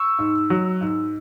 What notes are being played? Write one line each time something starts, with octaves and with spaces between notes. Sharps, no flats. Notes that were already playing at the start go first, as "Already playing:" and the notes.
Already playing: C#6 E6
G#2
F#3
G#2